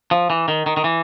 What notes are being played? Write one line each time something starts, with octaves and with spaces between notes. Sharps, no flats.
F3
E3
D#3
D#3
D#3
E3